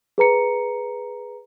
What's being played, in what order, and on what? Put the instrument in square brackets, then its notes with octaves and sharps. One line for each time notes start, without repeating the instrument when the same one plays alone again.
[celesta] G#4 B4 A#5 C#7